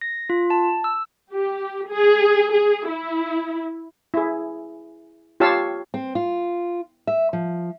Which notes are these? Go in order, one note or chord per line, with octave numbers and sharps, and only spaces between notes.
A#6
F4
A5
E6
G4
G#4
G#4
E4
E4 G#4
F4 G4 C#5 F5 A5 E6
C4
F4
E5
F3